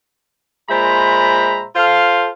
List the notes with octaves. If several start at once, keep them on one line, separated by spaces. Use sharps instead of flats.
A#2 G#3 C5 E5 A#5 B5
F4 A4 C5 F5